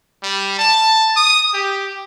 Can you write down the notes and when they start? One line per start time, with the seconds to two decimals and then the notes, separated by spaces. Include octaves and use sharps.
0.23 G3
0.59 A5
1.16 D#6
1.54 G4